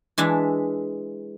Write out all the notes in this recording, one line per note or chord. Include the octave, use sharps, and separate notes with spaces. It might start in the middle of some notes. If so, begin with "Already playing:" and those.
E3 G#3 D4 E5